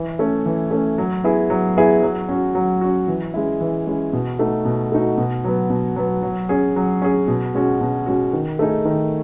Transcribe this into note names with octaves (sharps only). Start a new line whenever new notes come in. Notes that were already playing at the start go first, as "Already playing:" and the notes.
Already playing: E3
A3 C#4
E3
A3 C#4
F#3
B3 E4 G#4
F#3
B3 E4 G#4
F#3
C#4 F#4
F#3
C#4 F#4
E3
G#3 C#4 E4
E3
G#3 C#4 E4
B2
A3 D#4 F#4
B2
A3 D#4 F#4
B2
F#3 B3
B2
F#3 B3
F#3
C#4 G#4
F#3
C#4 G#4
B2
G#3 C#4 F#4
B2
G#3 C#4 F#4
D#3
A3 D#4 G#4
D#3